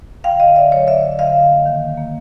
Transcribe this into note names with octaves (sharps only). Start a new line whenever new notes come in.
D3 F5 G5
D3 D#5 F5
D3 D5 E5
F#3 C#5 D#5
D3 D5 E5
D3
D3 D#5 F5
D3
A#3
D#3
A#3
A#3